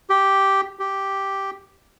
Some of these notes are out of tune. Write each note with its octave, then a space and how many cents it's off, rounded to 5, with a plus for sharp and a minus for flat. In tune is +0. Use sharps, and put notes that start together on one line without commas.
G4 -5
G4 -5